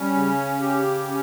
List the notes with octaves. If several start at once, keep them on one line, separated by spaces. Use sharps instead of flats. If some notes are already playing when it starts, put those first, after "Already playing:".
Already playing: G3 C#4
C#3
G4
C#4